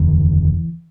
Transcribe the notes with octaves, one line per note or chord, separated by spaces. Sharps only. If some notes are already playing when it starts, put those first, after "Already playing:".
Already playing: F1 D#2 D3 E3